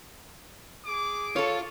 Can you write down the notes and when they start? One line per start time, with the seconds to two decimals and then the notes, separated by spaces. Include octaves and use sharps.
0.86 G#4 D6
1.36 F4 A4 C#5